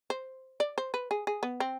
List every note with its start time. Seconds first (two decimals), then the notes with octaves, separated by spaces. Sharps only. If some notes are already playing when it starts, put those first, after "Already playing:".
0.10 C5
0.60 D5
0.78 C5
0.94 B4
1.11 G#4
1.27 G#4
1.43 B3
1.60 C4